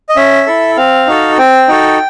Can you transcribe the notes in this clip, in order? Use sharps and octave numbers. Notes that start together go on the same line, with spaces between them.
D#5
C#4 E5
E4 A4
C4 F5
D#4 F#4 A4
C4 G5
D#4 F#4 A4